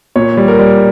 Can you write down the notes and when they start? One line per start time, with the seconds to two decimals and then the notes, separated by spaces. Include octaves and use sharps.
0.16 A#2 C#5
0.37 G3
0.48 A#4
0.59 G3